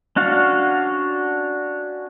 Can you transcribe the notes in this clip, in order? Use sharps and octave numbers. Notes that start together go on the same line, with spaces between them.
C#4 D4 F#4 F5